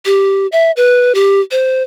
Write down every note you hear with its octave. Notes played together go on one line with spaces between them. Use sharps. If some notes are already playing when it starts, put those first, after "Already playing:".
G4
E5
B4
G4
C5